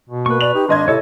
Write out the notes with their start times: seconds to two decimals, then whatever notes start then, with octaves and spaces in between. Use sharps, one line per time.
0.10 B2
0.26 A#3 B4 C#6
0.41 D5 F7
0.55 D#4 G4
0.68 G#1 D4 D#5 C6 G#6
0.88 C3 E4 A4 C#5 D#5